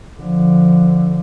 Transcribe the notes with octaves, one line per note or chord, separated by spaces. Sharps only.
D3 F3